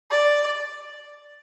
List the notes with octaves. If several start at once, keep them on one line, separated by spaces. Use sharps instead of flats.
D5